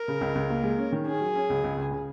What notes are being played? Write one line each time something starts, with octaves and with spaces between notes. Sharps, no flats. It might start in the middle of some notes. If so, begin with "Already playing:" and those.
Already playing: A#4
C#3
C#2
C#2
A#3
G#3
C#4
D#3
C#4 G#4
F#3
C#4
C#2
C#2
C#2
C#3